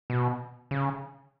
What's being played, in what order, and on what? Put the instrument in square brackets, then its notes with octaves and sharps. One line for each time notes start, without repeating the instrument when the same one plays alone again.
[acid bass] B2
C#3